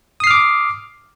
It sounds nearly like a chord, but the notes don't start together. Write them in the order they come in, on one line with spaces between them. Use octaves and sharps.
D#6 C7 F6 D6